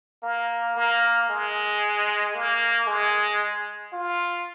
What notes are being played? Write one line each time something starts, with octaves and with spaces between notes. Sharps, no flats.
A#3
A#3
G#3
A#3
G#3
F4